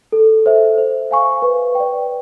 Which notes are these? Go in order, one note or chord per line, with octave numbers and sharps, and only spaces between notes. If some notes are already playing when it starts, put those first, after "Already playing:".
A4
C5 E5
C5
F5 G#5 C#6
B4
D5 G5